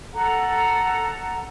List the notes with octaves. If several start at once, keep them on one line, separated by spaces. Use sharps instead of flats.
A4 F#5 A#5